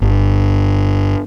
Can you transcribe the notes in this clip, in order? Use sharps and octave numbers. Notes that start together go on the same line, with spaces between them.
G1